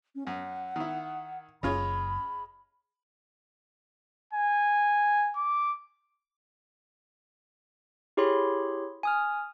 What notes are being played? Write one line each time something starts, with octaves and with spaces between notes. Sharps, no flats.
C#4
F#2 F#5
D#3 E4
F#1 G#3 C#4 F4 C#5 B5
G#5
D6
E4 G4 G#4 C#5 B5 C6
G#5 D#6 F6